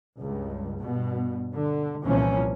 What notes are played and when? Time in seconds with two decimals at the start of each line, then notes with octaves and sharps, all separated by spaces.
0.19 C#2 G2
0.80 G2 B2
1.54 D3
2.03 C2 A#2 E3 F3 A#3 C#4